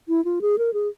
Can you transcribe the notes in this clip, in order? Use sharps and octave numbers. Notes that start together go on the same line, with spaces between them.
E4
F4
G#4
A#4
G#4